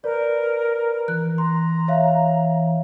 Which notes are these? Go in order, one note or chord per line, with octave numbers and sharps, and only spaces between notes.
A#4 B4 D5
E3 F#6
A#5 C6
C#5 E5 F5